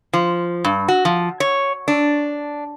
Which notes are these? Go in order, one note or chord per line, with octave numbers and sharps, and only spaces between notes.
F3
G2
F#4
F3
C#5
D4